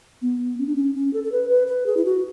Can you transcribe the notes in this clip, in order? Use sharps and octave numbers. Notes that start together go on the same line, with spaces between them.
B3
C#4
D4
C#4
C#4
A4
A4
B4
B4
B4
G#4
E4
F#4